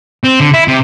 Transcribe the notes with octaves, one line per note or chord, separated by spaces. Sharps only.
C4
D3
E4
C3